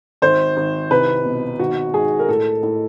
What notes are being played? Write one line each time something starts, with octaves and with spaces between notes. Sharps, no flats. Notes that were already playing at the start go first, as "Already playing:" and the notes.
G#1 C5
G#1
C2 B4
B2
G#1 F#4
G#2 G#4
A#4
A2 A4
A2